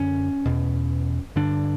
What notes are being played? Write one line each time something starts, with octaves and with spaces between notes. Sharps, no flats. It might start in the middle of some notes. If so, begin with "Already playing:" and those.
Already playing: F#2 D3 C#4
E2 B2
G2 D3 D4